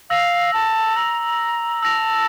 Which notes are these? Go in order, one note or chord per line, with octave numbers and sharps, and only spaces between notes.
F5 E6 A#6 F7
A5
A#5 E6 A#6 F7
A5 E6 A#6 F7